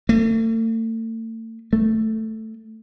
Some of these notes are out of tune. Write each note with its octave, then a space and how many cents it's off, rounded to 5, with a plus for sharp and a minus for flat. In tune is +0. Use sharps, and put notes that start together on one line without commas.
A3 +40
A3 +5